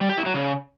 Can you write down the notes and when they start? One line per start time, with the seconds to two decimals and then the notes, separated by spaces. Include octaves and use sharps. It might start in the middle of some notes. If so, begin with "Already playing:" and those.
0.01 G3
0.09 G4
0.18 E4
0.26 F#3
0.34 C#3